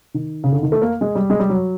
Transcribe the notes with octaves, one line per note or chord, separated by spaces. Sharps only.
D#3
C#3
D3
D#3
A3
A#3
G#3
G3
G#3
G3
F#3